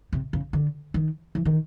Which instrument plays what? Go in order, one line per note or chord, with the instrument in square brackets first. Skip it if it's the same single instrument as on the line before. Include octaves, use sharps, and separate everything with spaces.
[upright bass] C3
C#3
D3
D#3
E3
D#3